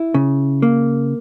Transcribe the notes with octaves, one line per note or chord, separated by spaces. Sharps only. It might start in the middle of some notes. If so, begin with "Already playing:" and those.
Already playing: E4
C#3
A#3